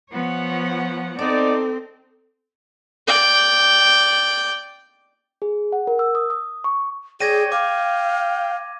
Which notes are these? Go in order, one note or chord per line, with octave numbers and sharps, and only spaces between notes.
F3 B3 C#5 F#5
C4 D#4 A4 D5
D5 G5
G#4
F#5
A#4
E6
D#6
D#6
C#6
G#4 C#5 D5 G5 G#6 A#6 D#7
F5 G5 D6